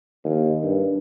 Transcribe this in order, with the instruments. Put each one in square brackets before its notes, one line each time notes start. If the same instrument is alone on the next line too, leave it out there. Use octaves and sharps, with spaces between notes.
[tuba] D#2
G2